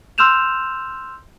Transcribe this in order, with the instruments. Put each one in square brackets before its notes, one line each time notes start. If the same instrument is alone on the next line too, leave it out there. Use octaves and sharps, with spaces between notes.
[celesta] C6 E6 F6 G6 E7 F7